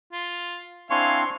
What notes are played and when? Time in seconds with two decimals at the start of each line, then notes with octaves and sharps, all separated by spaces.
0.12 F4
0.90 C4 D4 E4 F5 G#5 C6 C#6